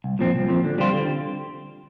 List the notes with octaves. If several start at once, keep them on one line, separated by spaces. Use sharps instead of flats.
C2
A#2 F3 C4
C2
A#2 F3 C4
D3
G3 C4 F4
D3